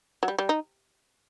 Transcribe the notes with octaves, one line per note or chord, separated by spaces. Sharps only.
F#3
G3
G3
D#4